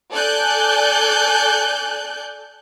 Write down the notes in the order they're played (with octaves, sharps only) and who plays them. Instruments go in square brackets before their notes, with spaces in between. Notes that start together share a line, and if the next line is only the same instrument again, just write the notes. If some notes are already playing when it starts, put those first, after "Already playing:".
[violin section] A4 D5 G#5 F#6 G6